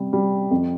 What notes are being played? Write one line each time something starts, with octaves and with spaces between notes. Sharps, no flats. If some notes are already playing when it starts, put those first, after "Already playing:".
Already playing: C3 G3
G3
F2